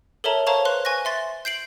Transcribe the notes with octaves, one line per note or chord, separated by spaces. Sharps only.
A4 A#4 C#5 E5 A5 A#5
C5 C#5 F5 A5 A#5 C#6
B4 C5 C6 F#6
G#5 C#6 F#6 A#6
E5 C6 A6
G6 C7 D7 F#7